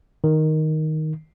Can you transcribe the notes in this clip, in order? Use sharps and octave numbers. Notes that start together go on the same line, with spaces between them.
D#3